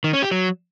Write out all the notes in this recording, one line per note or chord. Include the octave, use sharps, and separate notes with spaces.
D#3
C#4
G4
F#3